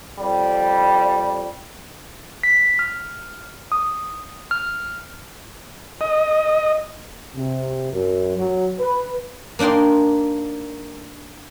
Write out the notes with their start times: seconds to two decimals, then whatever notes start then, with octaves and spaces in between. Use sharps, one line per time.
0.19 F2 G3
2.43 B6
2.79 F6
3.72 D#6
4.51 F6
6.01 D#5
7.36 C3
7.92 F#2
8.37 F#3
8.79 B4
9.59 A#3 D4 D#4 G5 C6